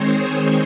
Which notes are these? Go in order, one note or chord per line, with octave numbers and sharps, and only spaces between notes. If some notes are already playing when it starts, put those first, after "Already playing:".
Already playing: D#3 G#3 C4 C5 C#5
G#4